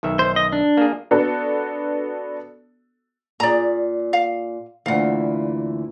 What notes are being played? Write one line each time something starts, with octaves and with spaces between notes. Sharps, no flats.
B1 D#3 E5
C5
D#5
D4
A#3 G#4
B3 D4 F#4 A4
A#2 G#4 D5 A#5
F5
D2 A#2 E3 F5 F#5